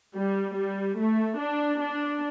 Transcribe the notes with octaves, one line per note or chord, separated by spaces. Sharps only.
G3
G3
A3
D4
D4